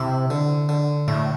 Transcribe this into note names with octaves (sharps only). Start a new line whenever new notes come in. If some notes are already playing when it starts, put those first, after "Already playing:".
Already playing: C3 E4
D3
D3
A2 A3